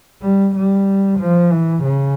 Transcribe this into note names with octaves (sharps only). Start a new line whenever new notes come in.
G3
G3
F3
E3
C#3